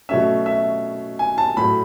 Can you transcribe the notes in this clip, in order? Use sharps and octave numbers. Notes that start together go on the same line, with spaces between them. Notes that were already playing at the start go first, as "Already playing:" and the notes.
B2 F#3 A3 C#4 E5
E5
G#5
A5
A2 F#3 A3 B5